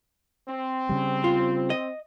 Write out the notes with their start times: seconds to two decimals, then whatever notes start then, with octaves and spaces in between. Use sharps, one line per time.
0.48 C4
0.89 C#3 G3
1.24 F4
1.70 D#5